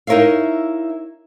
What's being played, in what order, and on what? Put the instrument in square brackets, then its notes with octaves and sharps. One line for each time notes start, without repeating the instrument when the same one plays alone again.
[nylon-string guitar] D#4 E4 A#4 C#5 E5 F5